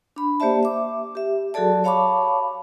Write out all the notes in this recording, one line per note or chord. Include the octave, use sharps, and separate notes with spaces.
D4 B5
A#3 G4 C5 D5 E5 A5
E5 D6
G4 E5
F#3 F#4 G#4 A4 D5 A5
C#5 F5 A5 B5 C#6 D6